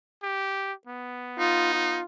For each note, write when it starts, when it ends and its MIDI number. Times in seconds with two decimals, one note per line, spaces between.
0.23 0.73 67
0.87 2.01 59
1.39 1.99 63
1.39 1.70 65
1.74 2.03 65